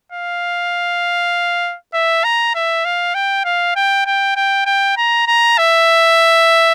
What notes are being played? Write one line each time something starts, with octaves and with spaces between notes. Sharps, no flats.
F5
E5
A#5
E5
F5
G5
F5
G5
G5
G5
G5
A#5
A#5
E5